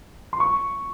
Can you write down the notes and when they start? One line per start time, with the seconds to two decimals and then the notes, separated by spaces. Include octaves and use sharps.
0.33 C6
0.40 C#6